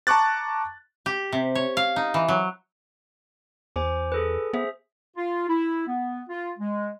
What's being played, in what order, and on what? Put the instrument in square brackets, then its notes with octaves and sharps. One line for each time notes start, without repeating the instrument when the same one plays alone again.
[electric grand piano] A5 A#5 C#6 D6 F#6 A6
[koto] G4
C3
C#5
F5
D#4
E3
F#3
[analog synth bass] E2 [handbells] C5 G#5 D6
[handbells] G#4 A4 B4
[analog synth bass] B3 [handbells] G#4 C5 E5
[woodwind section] F4
E4
B3
F4
G#3